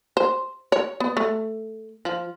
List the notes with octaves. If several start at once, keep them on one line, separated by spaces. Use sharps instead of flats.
C5
C#5
B3
A3
F3